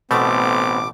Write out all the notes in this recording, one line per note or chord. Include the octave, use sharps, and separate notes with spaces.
A1 B2 A3 B3 C4 D6